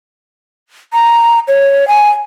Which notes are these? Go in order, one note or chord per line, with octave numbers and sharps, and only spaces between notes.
A#5
C#5
G#5